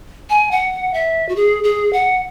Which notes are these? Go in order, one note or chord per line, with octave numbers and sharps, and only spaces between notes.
G#5
F#5
E5
F#4
G#4
G#4
F#5